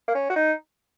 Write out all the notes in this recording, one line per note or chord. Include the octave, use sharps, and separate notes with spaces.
A#3
C#4
F#4
D#4